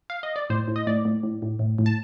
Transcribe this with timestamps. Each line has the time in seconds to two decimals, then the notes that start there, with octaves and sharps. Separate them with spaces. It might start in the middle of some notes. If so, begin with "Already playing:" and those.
0.10 F5
0.23 D#5
0.36 D5
0.50 A2 C5
0.68 A2
0.76 D#5
0.87 A2 D5
1.05 A2
1.23 A2
1.42 A2
1.59 A2
1.79 A2
1.86 A5